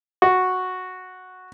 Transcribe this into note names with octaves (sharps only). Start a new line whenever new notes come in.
F#4